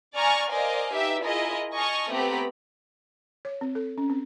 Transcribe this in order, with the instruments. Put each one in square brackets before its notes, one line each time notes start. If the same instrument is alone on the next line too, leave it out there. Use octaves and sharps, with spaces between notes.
[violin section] D5 G#5 A#5 C#6 F6 A6
A#4 C5 D5 D#5 F5 G#5
D#4 G4 B4 E5
E4 F4 G#4 A#4 D#5
D#5 G#5 A5 C#6 D#6 F6
A3 B3 C4 G4 A#5 B5
[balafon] C#5
C4
A4
C#4
C4